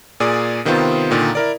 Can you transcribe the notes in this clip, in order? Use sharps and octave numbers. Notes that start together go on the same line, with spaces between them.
A#2 G#4 D5 D#6
C3 D#3 B3 C4 F4 C5
A#2 D3 D#3
E4 A#4 D5